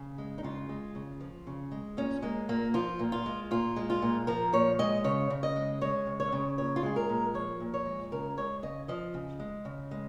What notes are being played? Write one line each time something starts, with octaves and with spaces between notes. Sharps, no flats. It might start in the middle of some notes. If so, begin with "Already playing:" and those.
Already playing: C#3
G#3
D#4
C#3 F4
G#3
C#3
F3
C#3
G#3
A#2 C#4
G#3 A#3
A#2 A#3
F3 F4
A#2
F4
G#3
A#2 F4
G#3
F4
A#2
F3 A#4
A#2 C#5
G#3 D#5
C#3 C#5
C#3
D#5
G#3
G#3 C#5
C#3
C#5
C#3
A#2 C#5
F4
G#3 G#4
A#4
A#2
F3 C#5
A#2
C#5
G#3
C#3 A#4
G#3 C#5
C#3 D#5
F3 D#5
C#3
G#3
C#3
G#3